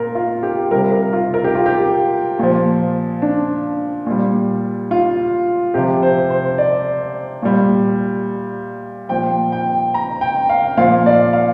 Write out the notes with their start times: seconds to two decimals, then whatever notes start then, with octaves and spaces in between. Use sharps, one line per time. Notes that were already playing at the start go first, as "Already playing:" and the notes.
Already playing: A#2 A#4
0.15 F4
0.43 G4
0.71 C3 G3 A#4
0.92 A#4
1.13 F4
1.34 A#4
1.44 G4
1.55 F4
1.66 G4
2.39 A#2 F3
3.22 D4
4.06 A#2 G3
4.91 F4
5.74 C3 F3 G4
6.03 C5
6.30 C5
6.58 D5
7.42 A#2 G3
9.09 A#2 F3 G5
9.52 G5
9.94 A#5
10.21 G5
10.49 F5
10.77 A#2 F3 F5
11.06 D5
11.33 F5